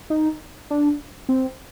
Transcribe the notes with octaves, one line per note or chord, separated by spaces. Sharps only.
D#4
D4
C4